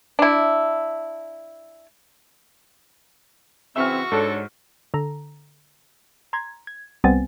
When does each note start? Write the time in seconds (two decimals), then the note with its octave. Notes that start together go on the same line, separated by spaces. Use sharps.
0.19 D4 E4
3.76 C#3 E3 C4 F#4 E5 C#6 E6 F6
4.12 G#2 D4 A4 C#5
4.94 D3 A4 A#5
6.33 A#5 C6 G#6
6.67 G#6
7.04 C2 G3 B3 C4 G#5 A6